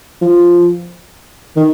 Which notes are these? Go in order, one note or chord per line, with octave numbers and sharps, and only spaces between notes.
F3
D#3